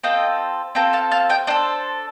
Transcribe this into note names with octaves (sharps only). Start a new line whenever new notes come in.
C4 F4 A4 D#5 G5
C4 F4 A4 G5 A#5
F5 A5
F5 A5
D#5 G5
D4 A4 C5 D#5